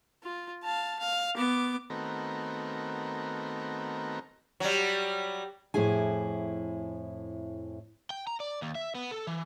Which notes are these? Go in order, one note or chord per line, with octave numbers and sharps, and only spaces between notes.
F4
F5 A5
F5
B3 D6
D#3 A3 B3 C4 F#4 A#4
F#3 G3
F2 A2 E4 G#4 G#5
G5
A#5
D5
D#2
E5
B3
A4
E3